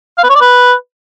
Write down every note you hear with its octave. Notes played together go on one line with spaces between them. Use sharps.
F5
B4
C#5
D5
B4